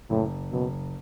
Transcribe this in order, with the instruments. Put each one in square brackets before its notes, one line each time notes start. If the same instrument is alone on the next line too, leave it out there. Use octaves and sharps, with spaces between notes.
[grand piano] F#1 [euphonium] A2
[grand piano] F#1 [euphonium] B2